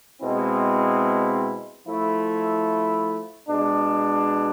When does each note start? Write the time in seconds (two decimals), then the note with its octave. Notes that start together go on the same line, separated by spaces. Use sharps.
0.21 B2 G#3 C4 E4
1.85 F3 A3 E4
3.48 B2 G#3 D4